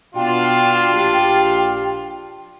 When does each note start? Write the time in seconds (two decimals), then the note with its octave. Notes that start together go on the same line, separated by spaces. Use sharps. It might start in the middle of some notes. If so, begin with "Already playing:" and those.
0.15 B2 D4 F4 F#4 G5
0.92 A#1 G4